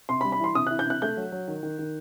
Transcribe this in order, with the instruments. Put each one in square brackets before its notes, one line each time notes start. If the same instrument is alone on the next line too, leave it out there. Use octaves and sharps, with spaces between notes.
[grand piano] C3 C6
B5
G3
B5
E3 C6
C3 D#6
E3 F#6
G6
C3 F#6
A3 G6
F#3
F#3
D#3
D#3
D#3